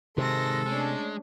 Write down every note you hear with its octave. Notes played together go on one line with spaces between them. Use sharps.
C3 D#3 G#3 A4 C6 A#6
G#3 A3 C#4 D4